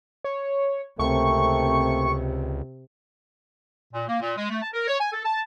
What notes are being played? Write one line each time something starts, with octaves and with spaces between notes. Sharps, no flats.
C#5
C#2 C3 A3 A#3 C4 C#6
A#2
A#3
A#2
G#3
A3
A5
A#4
C#5
G#5
A4
A5